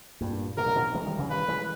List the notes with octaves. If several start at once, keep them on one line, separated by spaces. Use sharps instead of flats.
G2 A#2
G#2 B2 A#4
A#2 C#3
B2 D#3
E3 G#3
D#3 G3
C#3 E3
D#3 G3 B4
E3 G#3